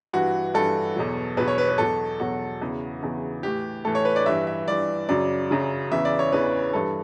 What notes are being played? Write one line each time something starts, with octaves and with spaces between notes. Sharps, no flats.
G2 E3 F#4
G2 E3 A4
E2 B2 F#3
E2 B2 F#3 B4
C#5
B4
B4
E2 B2 F#3 A4
E2 B2 F#3 F#4
E2 C#3 E3
E2 C#3 E3
A2 E3 G4
A2 E3 A4
C#5
B4
D5
G2 E3 E5
E5
G2 E3 D5
F#2 C#3 F#3 D5
F#2 C#3 F#3
E2 C#3 E3 E5
D5
C#5
E2 C#3 E3 B4
G2 E3 A4